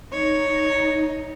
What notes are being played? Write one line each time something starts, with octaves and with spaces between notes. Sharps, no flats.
D#4 C#5